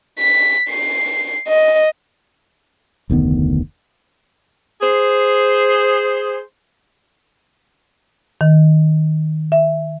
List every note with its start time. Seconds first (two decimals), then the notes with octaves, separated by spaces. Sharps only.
0.19 B6
0.70 C7
1.48 D#5
3.10 F1 D2 D#3 B3
4.82 G#4 C5
8.41 D#3
9.52 E5